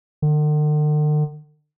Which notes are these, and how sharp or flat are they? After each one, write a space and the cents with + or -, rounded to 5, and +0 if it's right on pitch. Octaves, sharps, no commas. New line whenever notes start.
D3 +45